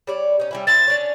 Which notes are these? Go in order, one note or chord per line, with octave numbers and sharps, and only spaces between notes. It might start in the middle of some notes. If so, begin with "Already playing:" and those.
G3 C#5 D5
C#4 D#4
G3 C#4 E4
C4 E4 A6
C#4 D4 C#5